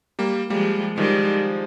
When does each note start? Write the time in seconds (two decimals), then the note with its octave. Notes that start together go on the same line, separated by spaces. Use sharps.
0.19 G3 A#3
0.50 F3 G3 G#3 A#3
0.97 D#3 F3 G3 G#3